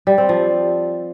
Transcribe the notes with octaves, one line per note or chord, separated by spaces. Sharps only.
G3
C4
F3